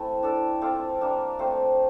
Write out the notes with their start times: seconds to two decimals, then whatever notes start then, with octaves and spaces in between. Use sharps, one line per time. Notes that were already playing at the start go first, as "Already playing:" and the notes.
Already playing: A3 C4 E4
0.23 D4 A4 D5
0.61 C4 F4 A4 D5
1.01 G3 A#3 D4
1.39 A3 C4 F4 C5